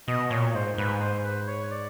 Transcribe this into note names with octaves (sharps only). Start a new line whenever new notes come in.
B2 D#5
A#2 C#5
G#2 C5
G#2 B4
C5
B4
C#5
D5